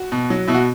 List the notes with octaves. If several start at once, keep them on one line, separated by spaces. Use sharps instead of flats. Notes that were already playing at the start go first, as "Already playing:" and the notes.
Already playing: F#4
B2
F#3
B2 E4
F#4